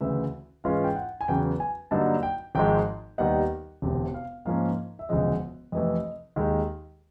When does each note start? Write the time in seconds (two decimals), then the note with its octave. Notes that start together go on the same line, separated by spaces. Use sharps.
0.01 D2 C#3 E3 A3 E5
0.64 G#2 E3 G#3 C#4 F4 F5
0.84 G5
0.96 F#5
1.21 G#5
1.28 E2 C#3 F#3 B3 G5
1.60 G#5
1.91 G2 D3 F#3 A#3 D#4 A5
2.23 G5
2.55 G#1 G#2 F3 G#3 G5
3.18 D#2 D#3 G3 B3 D#4 F#5
3.82 E1 D2 C3
4.14 F5
4.45 G#2 F3 A#3 C#4 F5
4.99 E5
5.09 E1 D2 C#3 F3 G#3 D#5
5.72 F2 C3 E3 A3 D#5
6.36 D#2 D#3 G#3